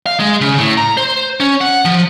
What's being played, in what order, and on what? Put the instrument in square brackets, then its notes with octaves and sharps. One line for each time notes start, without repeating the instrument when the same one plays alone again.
[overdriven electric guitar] F5
G#3
C#3
A2
A#5
C5
C#4
F#5
F3